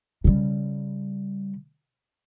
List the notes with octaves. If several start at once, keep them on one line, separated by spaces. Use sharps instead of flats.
C#3 G3